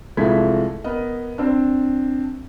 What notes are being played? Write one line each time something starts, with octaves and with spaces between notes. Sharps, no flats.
C2 F3 G#3 A3 G#6 B6
B3 A#4 D#5
C4 D4